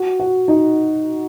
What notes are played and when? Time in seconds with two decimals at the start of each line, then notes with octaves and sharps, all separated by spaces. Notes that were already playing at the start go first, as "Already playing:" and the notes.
Already playing: F#4
0.20 F#4
0.48 D#4